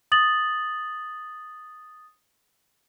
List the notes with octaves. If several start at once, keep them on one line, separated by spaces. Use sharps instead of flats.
D#6 A6 F#7